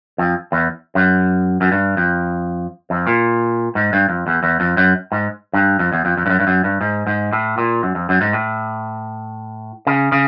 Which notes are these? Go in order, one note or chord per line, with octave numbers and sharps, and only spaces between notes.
F2
E2
F#2
F#2
G2
F2
F2
A#2
G#2
G2
F2
E2
E2
F2
F#2
G#2
G2
F2
E2
F2
F2
G2
F#2
G2
F#2
G2
G#2
G#2
A2
A#2
F#2
F2
F#2
G#2
A2
C#3
C#3